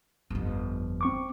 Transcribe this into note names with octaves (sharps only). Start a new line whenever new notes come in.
G1 F2
C4 C#6 D6